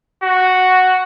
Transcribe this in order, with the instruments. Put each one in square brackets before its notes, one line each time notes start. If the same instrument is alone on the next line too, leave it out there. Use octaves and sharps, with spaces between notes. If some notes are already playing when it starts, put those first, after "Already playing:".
[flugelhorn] F#4